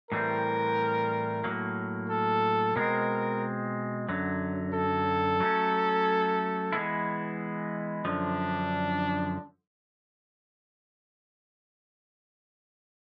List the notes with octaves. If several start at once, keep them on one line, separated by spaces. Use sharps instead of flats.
A2 E3 G3 C4 A#4
A2 F#3 A#3
A4
B2 G#3 C4 A#4
F#2 D3 F#3
A4
F#3 A3 C#4
E3 G#3 B3 E4
F#2 D3 F3 D4